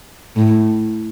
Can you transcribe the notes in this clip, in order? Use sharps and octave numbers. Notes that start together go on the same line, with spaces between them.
A2